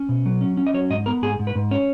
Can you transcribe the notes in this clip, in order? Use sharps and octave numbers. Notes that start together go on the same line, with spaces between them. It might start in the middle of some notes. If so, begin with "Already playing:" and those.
Already playing: C#4
B2
F#3
C#4
C#4
D#5
F#3 C#5
G#2 D#5
B3 A#4
G#2 G#4
G#2
B4
G#2
C#4 C#5